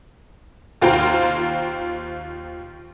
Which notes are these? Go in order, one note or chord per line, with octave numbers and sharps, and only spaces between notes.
D#2 F4 C5 G5 A#5